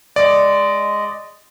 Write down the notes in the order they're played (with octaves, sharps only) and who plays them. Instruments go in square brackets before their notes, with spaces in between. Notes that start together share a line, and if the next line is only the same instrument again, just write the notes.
[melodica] G#3 D#5 [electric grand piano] D5